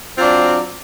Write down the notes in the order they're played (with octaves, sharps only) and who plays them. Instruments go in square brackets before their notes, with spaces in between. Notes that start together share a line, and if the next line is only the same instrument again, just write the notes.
[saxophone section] F#3 C4 D4 F4